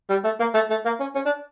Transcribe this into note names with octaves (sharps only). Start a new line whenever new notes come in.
G3
A3
A#3
A3
A3
A#3
C#4
C#4
D4